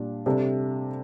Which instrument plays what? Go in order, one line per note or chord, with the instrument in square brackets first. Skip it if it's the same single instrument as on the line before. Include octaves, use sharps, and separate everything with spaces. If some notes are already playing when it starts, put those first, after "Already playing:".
Already playing: [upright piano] A#2 G3 D4
C3 G3 D4 A4